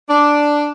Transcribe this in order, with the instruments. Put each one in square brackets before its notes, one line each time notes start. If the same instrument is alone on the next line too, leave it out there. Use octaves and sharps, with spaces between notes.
[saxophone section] D4